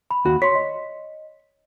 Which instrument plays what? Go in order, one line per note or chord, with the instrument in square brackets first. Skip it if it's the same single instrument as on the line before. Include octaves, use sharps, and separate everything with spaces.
[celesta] B5
[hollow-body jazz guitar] D#2 F#4
[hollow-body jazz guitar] C#5 [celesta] C6 B6
[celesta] D#5